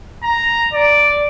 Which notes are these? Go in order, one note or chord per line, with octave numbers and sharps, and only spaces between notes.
A#5
D5